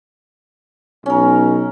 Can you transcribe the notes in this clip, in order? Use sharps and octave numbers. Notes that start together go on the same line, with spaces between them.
B1 C#4 A#4